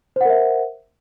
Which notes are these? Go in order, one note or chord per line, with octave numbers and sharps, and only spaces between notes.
A#4 C5 E5 F#5